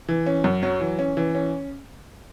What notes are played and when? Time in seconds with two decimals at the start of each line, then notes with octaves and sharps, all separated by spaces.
0.09 E3
0.26 C#4
0.44 F#2
0.63 F#3
0.81 E3
0.99 C#4
1.17 E3
1.35 C#4